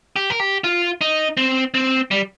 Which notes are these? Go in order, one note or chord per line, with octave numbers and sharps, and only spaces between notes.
G4
A#4
G4
F4
D#4
C4
C4
G3